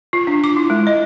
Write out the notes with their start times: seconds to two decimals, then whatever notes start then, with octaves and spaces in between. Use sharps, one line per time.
0.13 F4
0.27 D4
0.44 D6
0.56 E4
0.70 G#3
0.87 D#5